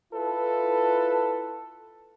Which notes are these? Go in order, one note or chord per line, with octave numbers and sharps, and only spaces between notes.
E4 F4 A4 B4